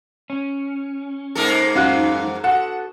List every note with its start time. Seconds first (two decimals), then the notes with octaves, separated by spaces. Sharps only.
0.30 C#4
1.35 G#2 A#3 A4
1.75 F#2 E3 D#4 F#4 F5 F#6
2.44 F#4 A4 F#5